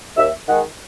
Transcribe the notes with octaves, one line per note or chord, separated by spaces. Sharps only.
D#2 E5
D#3 G#3 F#5